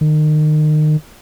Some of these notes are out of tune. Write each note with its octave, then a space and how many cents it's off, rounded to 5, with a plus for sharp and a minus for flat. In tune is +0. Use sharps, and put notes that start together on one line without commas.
D#3 -30